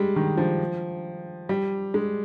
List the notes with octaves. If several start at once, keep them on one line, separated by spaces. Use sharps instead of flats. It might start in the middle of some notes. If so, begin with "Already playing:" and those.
Already playing: G3 G#3
D#3
F3
G3
G#3